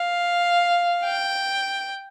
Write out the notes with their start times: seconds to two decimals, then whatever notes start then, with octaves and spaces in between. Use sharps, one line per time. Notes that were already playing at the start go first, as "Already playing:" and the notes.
Already playing: F5
1.04 G5